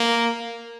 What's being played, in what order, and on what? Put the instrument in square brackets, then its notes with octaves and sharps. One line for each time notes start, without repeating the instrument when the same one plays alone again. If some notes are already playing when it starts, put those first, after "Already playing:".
Already playing: [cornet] A#3